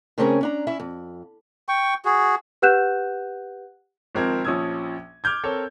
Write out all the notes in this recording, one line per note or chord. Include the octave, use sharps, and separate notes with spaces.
C#3 A3 C4 C#4 G#4 A#4
C#4 D4 A#5
C#4 E4 E5
F2
G5 C#6
F#4 G#4
G4 B4 F#5 F#6 G6 E7
G#1 F3 C4 A#4 G#6
A#1 F3 C#4 D#6 E6 G#6
D6 F6 G6 G#6
C4 A4 A#4 C#5